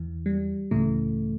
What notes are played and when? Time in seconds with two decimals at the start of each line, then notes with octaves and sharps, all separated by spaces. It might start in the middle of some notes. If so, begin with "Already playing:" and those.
Already playing: E2 E3
0.26 G3
0.71 C#2 A2 C#3 E3 A3